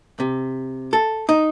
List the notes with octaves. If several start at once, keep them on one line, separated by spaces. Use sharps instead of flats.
C3
A4
D#4